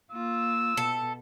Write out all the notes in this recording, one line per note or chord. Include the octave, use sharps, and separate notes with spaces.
A#3 F4 E6
B2 A4